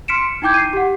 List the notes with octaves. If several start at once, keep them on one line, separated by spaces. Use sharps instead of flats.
C6 F6 B6 C#7 D7 E7
D#4 E4 G5 D6 G6 G#6
C7 D#7
G4 F#5